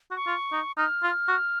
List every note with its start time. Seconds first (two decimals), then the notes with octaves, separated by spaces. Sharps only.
0.11 F#4
0.15 C#6
0.27 F4
0.52 D#4
0.78 D#4 F6
1.03 F4
1.28 F#4